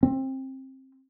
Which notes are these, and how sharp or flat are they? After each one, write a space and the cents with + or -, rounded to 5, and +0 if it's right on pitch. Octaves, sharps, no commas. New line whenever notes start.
C4 +20